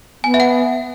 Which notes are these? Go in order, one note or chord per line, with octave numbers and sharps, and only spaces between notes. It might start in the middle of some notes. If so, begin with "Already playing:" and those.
B3 G#5
E5
F#5